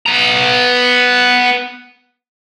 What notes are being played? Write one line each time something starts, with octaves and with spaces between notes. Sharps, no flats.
B3 A#5